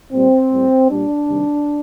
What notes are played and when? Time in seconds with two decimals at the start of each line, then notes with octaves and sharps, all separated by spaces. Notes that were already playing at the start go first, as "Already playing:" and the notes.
0.12 A#2 G3 C4
0.52 A2 G3
0.90 A#2 G3 D4
1.29 C3 D#3 G3